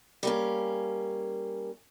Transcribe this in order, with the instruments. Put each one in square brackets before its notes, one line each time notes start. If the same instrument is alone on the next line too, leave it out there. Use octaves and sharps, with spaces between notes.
[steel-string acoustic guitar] G3 A#3 C#4